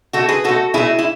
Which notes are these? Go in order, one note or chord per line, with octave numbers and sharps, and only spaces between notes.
B2 A3 F#4 A4
G#4 B4
B2 A3 F#4 A4
B2 A3 E4 G#4
E4